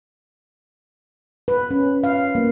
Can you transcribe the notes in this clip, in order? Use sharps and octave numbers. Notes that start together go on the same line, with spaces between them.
B4
C#4
F5
A#3